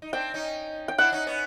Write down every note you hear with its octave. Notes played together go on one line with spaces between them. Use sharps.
D#4
C4 D4 G5
C#4 D#4
G5
D4 E4 F#5
C#4 D#4
B3 C#4